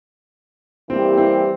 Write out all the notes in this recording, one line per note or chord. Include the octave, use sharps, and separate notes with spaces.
E3 G3 A#3 C4 E4 G4
C4